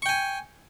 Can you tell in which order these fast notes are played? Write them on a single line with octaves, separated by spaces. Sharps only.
C#6 G5 G#5